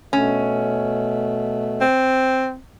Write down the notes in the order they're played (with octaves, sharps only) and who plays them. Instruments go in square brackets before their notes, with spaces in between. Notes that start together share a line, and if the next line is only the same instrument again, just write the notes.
[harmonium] B2 A3 [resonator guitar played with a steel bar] C#4
[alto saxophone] C4